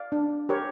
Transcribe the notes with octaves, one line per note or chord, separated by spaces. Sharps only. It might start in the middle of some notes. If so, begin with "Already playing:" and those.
Already playing: D5 F5
D4
G4 A#4 C#5